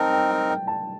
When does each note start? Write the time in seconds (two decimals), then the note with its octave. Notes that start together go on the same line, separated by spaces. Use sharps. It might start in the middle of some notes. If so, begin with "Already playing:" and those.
Already playing: C4 D#4 A#4 G5 A5
0.13 G5
0.31 G5
0.50 G5
0.67 A5